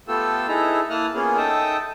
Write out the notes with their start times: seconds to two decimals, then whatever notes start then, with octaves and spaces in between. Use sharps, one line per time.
0.08 A3 B3 F4 G4 A4 E6
0.48 D#4 E4 G#4 A4 B4 A#5
0.90 A#3 E4 A5 D#6 F6 F#6
1.14 A#3 B3 C#4 F4 G#4 A#4
1.37 D#4 A4 E5 G5 A5 D#6